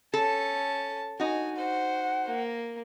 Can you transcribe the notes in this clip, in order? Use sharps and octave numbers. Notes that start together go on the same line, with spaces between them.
C#4 A4 A5
D#4 F#4 G#5
C5 F#5
A#3